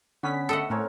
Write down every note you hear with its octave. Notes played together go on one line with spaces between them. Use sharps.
D3 B3 C#4 B6
A3 B3 A4 D#5 F#5
A2 C4 C#4 A#4